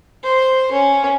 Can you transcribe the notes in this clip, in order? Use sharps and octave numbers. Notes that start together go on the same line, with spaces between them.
C5
C#4